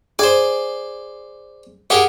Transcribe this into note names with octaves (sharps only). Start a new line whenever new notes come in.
G#4 C5 D5
G4 G#4 A#4 F#5